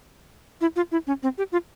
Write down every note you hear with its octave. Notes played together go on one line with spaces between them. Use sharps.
E4
F4
E4
C#4
C4
G4
F4